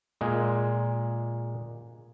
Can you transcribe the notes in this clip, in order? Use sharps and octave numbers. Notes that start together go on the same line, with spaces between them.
A#2 G#3